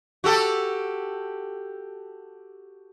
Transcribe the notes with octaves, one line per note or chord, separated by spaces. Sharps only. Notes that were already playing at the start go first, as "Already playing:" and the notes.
F#4 G4 A4